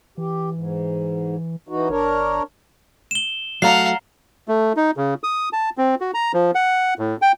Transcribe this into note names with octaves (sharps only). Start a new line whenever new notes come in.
E3 G4
G#2
E3 D#4 F#4
G1 D4 A#4 C#5
E7 G7
F#3 A3 F#4 D5 F5 F#5 A#5 C7
A3
D#4
C#3
D#6
A5
C4
F#4
A#5
F3
F#5
A2
G5